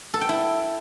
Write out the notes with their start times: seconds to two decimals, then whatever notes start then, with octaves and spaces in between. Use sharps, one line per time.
0.14 A4
0.21 G5
0.29 E4